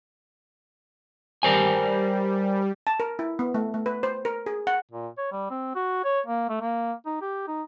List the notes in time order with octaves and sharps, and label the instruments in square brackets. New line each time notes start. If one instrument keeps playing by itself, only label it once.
[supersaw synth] G3 [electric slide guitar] A#4 C5 G#5
[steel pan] A5
A#4
E4
B3
A3
A3
B4
C5
A#4
G#4
F#5
[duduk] A#2
C#5
G3
C4
F#4
C#5
A#3
A3
A#3
D#4
G4
D#4